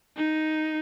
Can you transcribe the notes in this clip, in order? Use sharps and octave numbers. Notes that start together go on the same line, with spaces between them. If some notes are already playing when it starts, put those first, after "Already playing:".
D#4